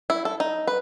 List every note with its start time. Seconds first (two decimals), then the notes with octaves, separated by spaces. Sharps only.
0.10 E4
0.25 A4
0.40 D#4
0.67 B4